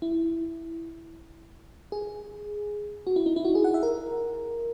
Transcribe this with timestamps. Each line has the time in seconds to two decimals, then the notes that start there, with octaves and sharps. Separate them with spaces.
0.02 E4
1.92 G#4
3.07 F#4
3.16 E4
3.26 D#4
3.36 E4
3.45 F#4
3.55 G#4
3.64 F#5
3.74 E5
3.83 A#4